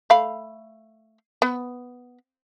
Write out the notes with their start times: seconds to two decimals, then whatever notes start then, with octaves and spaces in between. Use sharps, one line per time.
0.10 A3 F5 B5
1.42 B3